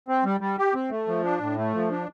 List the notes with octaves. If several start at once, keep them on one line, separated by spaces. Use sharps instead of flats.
C4
G3
G3
G4
C4
A3
F3
D4
A2
A3
F3
D4